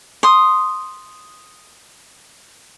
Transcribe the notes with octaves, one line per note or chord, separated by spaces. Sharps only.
C6 D#6